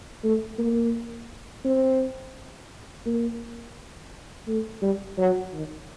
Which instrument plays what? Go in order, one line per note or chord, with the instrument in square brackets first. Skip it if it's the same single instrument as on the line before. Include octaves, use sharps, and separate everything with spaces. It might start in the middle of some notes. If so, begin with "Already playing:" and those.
[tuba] A3
A#3
C4
A#3
A3
G3
F#3
D#3